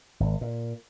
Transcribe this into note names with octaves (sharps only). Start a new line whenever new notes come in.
G#1
A#2